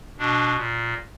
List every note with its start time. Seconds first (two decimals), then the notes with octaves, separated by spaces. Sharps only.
0.18 B2 D4
0.56 A#2